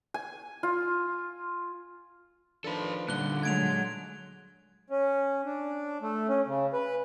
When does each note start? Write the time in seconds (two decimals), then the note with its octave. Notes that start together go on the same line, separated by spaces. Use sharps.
0.14 G#5
0.63 F4
2.64 D#3 F3 D4 A4 B4
3.08 A#2 D3 G3 F#6 G7
3.43 F#3 G#3 G#6 D7 F7
4.90 C#4
5.45 D4
6.02 A3
6.28 C#4
6.47 C#3
6.73 B4